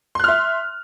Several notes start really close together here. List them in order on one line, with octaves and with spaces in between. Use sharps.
C6 F#6 F6 E5